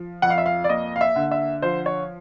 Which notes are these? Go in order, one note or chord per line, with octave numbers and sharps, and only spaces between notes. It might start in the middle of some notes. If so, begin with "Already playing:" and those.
Already playing: F3
F2 F#5
F5
E5
F5
D5
A#3 D#5
F5
E5
D3
E5
F3 C5
C#5